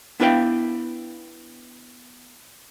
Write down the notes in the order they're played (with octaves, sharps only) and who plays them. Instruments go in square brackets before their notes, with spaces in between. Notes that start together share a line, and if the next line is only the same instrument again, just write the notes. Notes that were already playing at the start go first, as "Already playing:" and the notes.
[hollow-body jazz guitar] B3 D4 E4 B4 F5 G5